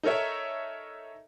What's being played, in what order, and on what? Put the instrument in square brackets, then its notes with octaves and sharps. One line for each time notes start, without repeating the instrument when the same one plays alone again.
[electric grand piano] D#4 A4 A#4 C#5 E5